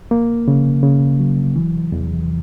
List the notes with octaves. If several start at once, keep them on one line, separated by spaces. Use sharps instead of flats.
A#3
C#3
C#3
F#3
E3
E2